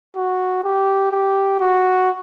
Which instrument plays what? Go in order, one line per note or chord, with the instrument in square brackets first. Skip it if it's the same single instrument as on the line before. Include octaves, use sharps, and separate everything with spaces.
[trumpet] F#4
G4
G4
F#4